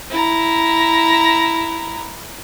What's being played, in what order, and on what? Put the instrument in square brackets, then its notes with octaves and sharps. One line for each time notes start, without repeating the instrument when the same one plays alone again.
[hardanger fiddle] E4 A#5